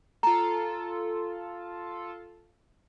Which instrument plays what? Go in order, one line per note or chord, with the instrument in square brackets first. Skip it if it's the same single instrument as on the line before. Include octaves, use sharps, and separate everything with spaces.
[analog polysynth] F4 A4 [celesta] A#5